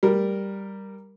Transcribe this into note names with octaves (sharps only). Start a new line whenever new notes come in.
G3 A#4